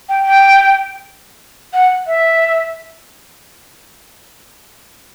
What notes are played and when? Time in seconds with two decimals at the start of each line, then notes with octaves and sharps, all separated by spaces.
0.09 G5
0.25 G5
1.73 F#5
2.07 E5